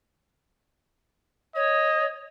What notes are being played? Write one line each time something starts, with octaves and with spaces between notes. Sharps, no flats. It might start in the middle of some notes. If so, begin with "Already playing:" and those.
C#5 D#5